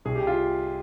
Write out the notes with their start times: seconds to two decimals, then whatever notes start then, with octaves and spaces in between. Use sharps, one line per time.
0.05 C2 G#4
0.15 G4
0.27 F4